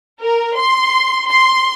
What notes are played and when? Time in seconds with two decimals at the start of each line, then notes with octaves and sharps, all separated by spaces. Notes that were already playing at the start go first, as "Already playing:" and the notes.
0.21 A#4
0.56 C6
1.27 C6